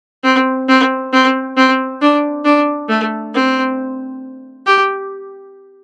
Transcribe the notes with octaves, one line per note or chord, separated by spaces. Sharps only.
C4
C4
C4
C4
D4
D4
A3
C4
G4